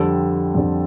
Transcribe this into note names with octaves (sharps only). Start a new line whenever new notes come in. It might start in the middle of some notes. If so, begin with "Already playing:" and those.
Already playing: F2 D3 G3 C4 A4
F2 D3 G3 C4